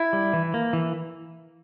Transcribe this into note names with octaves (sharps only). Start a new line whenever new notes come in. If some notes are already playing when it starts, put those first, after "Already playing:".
Already playing: E4
G3
E3
A#3
E3